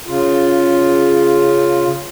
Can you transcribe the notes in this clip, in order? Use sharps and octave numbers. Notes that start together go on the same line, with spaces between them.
C#3 F4